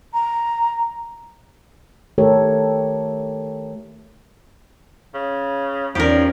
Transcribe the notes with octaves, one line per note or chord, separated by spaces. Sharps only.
A#5
D#3 A3 G4 A4 A#4 C#5
C#3
E2 F3 G3 C#4 D#4 G4 A#4